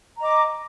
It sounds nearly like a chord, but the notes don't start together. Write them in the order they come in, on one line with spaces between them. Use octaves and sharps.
A#5 D#5 D6